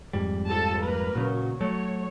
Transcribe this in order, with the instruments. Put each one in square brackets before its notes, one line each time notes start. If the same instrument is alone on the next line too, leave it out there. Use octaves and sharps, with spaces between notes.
[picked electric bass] F2 G#2 G3
[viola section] F3 A4 A5
A#3 A#4 B4
[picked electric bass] A#2 C#3 [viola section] F#3
[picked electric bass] F#3 A3 [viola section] C#5